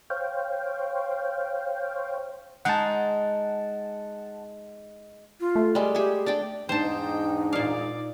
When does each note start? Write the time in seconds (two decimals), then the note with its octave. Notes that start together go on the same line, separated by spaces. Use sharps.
0.10 C5 C#5 F5 G5
2.65 G#3 D#4 F#5 A5
5.40 F4
5.55 A3
5.75 G3 G#3
5.95 G4 G#4 E5
6.26 D4 D5 G5
6.69 E2 G#2 D4 D#4 C5 G5 A5
7.53 A#2 D5 F5